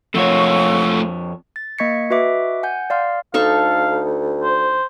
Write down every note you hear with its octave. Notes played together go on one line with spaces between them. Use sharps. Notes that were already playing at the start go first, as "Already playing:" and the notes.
F2 A3 F4 C#5 F#5 C#6 E6
A6
A#3 D#5 C#6 G#6 B6 C#7
F#4 B4 D#5 E5 D6
F#5 G#5 G6
D5 F5 C6 F6
D2 D#4 A4 F5 C#6
C5